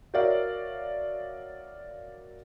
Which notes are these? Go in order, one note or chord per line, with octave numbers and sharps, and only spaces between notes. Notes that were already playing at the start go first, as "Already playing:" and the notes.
F#4 A#4 C#5 D5 E5 F5